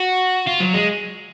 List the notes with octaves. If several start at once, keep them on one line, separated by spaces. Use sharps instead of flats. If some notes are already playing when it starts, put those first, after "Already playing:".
Already playing: F#4
F4
F#3
G#3